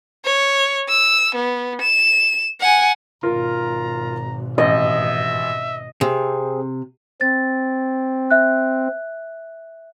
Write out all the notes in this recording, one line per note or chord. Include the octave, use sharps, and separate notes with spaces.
C#5
E6
B3
E7
F#5 G#5
G#1 B2 F4 A#4 A#5
A1 D#5 E5
C3 C4 G#4
C4 A6
E5 F#6